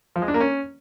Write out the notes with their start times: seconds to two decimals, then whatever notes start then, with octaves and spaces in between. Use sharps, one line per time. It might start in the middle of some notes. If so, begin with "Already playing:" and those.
0.16 F3
0.22 G#3
0.28 D4
0.34 A#3
0.40 C#4